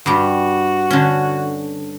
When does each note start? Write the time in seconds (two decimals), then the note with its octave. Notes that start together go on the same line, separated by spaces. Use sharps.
0.06 G2 G3 F#4
0.90 D3 C#4